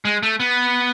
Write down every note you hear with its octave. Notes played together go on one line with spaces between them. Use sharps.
G#3
A3
B3